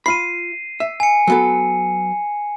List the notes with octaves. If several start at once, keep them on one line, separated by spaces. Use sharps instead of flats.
F4 B5 C7 D#7
E5
G#5 C#7
F#3 B3 A4